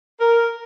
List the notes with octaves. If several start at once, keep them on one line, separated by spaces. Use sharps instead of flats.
A#4